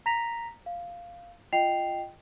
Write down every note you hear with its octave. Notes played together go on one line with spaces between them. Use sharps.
A#5 A#6 B6 F7
F5
F4 D#5 G5 C7 F7